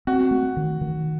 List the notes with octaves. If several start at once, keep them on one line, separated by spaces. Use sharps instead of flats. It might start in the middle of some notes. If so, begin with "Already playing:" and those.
C4 F#4
A3
D#3
D#3